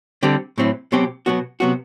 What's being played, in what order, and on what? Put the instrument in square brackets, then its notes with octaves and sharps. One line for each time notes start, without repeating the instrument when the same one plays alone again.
[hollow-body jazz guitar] D3 G3 C4 G4
A2 F#3 C4 E4
B2 F#3 C4 G4
B2 F#3 B3 F#4
C3 F#3 B3 F#4